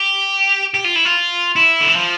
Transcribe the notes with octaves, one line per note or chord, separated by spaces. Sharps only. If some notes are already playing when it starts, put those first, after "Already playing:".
Already playing: G4
G4
F4
E4
F4
E4
D3
E3
F3